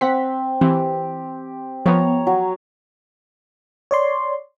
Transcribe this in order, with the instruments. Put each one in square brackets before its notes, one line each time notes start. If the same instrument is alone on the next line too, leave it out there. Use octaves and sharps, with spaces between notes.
[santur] C4 [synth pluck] F#5 B6
[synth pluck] E3 C4 [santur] G4
[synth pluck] F3 B3 [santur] C#5 A#5
[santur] F#3
[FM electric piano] C#5 D5 C6